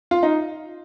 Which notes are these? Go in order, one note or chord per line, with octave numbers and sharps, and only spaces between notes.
F4
D#4